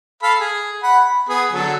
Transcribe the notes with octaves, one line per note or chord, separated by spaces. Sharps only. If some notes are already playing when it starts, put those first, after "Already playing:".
A4 F5 B5
G#4
F#5 B5
B5
B3 G#4
D3 F#3 A4